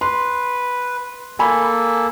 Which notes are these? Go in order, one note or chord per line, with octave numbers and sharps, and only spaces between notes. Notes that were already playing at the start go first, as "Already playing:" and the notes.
B4 C6
A#3 A4 G#5 B5